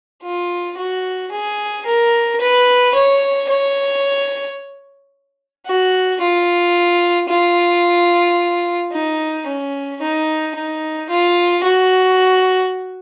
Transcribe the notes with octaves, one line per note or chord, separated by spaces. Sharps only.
F4
F#4
G#4
A#4
B4
C#5
C#5
F#4
F4
F4
D#4
C#4
D#4
D#4
F4
F#4